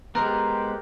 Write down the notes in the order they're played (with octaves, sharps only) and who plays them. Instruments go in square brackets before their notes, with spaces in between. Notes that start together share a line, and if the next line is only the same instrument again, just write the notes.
[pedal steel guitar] G#3 B3 [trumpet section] G4 [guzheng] A#4 [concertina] C5